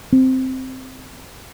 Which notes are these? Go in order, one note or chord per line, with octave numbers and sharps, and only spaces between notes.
C4